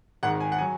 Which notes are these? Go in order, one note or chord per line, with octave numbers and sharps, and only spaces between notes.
G#1 G#2 D#3 F#5
G#5
F#5
F#3 G#5